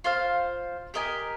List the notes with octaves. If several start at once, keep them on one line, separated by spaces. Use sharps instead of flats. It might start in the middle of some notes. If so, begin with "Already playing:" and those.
F4 C5 F5
G4 A#4 D#5 G#5